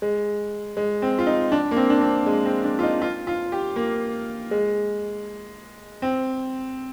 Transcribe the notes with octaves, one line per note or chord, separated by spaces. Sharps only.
G#3
G#3
C4
F4
D#4
D4
A#3
C4
D4
C4
G#3
C4
D4
F4
D#4
F4
F4
G4
A#3
G#3
C4